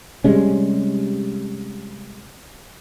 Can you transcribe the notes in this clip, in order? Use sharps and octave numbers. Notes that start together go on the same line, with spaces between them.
C3 G3 G#3 C#4